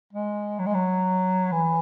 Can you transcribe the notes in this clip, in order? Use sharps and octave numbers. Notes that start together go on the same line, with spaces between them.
G#3
F#3
G#3
F#3
E3